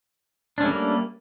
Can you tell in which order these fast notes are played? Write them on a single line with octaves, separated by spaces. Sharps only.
D4 C#4 A3 G3 A#3